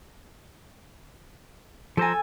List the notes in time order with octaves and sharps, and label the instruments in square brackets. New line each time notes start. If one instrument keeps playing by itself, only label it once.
[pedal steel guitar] F3 C5 A#5 [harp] A4 G#5